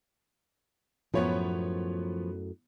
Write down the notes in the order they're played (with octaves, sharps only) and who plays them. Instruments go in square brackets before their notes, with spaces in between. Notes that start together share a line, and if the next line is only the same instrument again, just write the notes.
[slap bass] F#2 A2 [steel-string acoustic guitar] F3 [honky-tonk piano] B3 C#5 B5